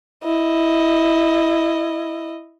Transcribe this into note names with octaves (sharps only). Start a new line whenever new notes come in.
E4 D#5